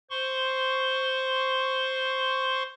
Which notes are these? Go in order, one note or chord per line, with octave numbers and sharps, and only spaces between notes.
C5 C6 C#6